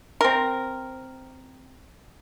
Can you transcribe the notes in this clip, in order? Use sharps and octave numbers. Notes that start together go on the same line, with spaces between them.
C4 A#4